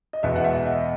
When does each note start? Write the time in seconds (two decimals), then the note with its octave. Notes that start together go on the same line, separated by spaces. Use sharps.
0.13 D#5
0.23 E2 B2 G#3 B3 E5
0.36 F#5
0.44 E5
0.65 D#5